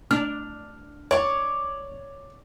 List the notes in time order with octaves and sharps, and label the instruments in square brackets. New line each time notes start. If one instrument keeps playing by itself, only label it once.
[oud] D4 [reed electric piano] F6
[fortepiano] C#5 [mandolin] D5 C#6